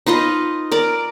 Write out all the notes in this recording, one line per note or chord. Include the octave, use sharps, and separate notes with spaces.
D#4 F4 B4 D#5
A#4 D5